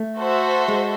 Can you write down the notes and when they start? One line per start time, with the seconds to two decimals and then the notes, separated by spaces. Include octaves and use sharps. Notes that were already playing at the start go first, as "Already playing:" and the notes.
Already playing: A3
0.20 F#4 A4 C5 E5
0.68 G#3